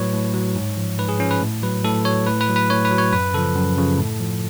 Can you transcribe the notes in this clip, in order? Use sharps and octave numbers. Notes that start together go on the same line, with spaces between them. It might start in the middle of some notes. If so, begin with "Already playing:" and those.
Already playing: A2 F#3 B4 C#5
A2
F#3
G#2
F3
G#2 B4
G#4
F3 C#4
B4
A2
F#3 B4
A2 A4
F#3 C#5
A2 B4
B4
F#3
B4
A2 C#5
B4
F#3
C#5
F#2 B4
C#3 F3 A4
F#2
C#3 F3
A2
F3